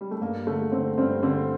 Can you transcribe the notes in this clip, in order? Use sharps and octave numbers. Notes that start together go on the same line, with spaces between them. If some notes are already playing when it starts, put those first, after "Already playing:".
G3
A3
G2 A#3
D3 A3
D3 C4
G2 C4
D3 C4